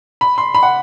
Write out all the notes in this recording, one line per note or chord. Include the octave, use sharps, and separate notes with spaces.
B5
C6
B5
F#5